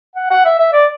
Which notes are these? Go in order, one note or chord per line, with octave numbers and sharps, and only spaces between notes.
F#5
F#5
E5
E5
D5